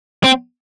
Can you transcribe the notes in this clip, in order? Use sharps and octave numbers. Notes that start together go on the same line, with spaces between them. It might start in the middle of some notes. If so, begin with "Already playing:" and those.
C4